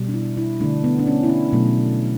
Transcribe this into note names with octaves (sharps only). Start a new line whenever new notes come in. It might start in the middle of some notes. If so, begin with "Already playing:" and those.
Already playing: B2 G3
D4
E4
E4
D3 A3 D4
B3
D4
C#4
E4
D4
B2 F#3 A3